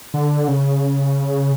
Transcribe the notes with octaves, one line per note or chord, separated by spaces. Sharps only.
D3
C#3